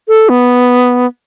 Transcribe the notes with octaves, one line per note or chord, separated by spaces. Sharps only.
A4
B3